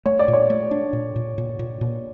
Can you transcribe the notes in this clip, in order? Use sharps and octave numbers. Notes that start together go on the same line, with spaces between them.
A3 C#5
D5
A#2
C#5
A3
D4
A#2
A#2
A#2
A#2
A#2